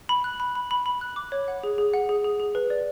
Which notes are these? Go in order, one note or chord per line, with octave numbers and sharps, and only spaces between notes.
B5
F#6
B5
B5
B5
B5
F#6
D6
C#5
F#5
G#4
G#4
F#5
G#4
G#4
G#4
B4
D5